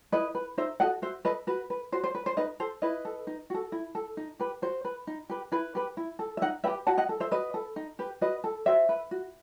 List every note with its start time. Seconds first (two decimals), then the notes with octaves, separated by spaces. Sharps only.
0.12 E4 B4 D#5
0.35 B4
0.58 D#4 C5 E5
0.80 F#4 A4 D#5 F#5
1.02 F#4 C5 E5
1.25 A4 B4 D#5
1.47 F#4 B4
1.70 B4
1.92 F#4 C5
2.04 C5
2.15 B4
2.26 C5
2.37 D#4 B4 D#5
2.60 A4 C5
2.82 E4 B4 D#5
3.05 A4
3.27 D#4
3.50 F#4 A4
3.72 E4
3.95 A4
4.17 D#4
4.40 G4 B4
4.62 F#4 C5
4.85 B4
5.07 D#4
5.30 G4 B4
5.52 E4 B4
5.75 G4 B4
5.97 E4
6.19 A4
6.37 E5
6.42 D#4 D#5 F#5
6.64 B4 E5 G5
6.67 G4
6.87 F#4 F#5 A5
6.98 D#5 F#5
7.09 A4
7.20 C5 E5
7.31 F#4 B4 D#5
7.54 A4
7.76 D#4
7.99 G4 B4
8.21 F#4 B4 D#5
8.44 A4
8.66 F#4 C5 E5
8.89 B4
9.11 F#4